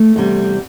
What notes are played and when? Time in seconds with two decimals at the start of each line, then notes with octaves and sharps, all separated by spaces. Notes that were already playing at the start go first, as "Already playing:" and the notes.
Already playing: A3
0.16 E2 C3 G3